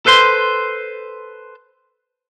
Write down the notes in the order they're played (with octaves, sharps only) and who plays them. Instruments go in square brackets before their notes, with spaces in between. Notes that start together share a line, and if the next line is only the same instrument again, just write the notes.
[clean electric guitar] A4 B4 C5 C6